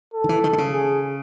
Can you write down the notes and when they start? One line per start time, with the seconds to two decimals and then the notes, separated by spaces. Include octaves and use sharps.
0.14 A4
0.24 D#3
0.29 E3
0.44 D#3
0.53 D3
0.58 C#3
0.73 G#4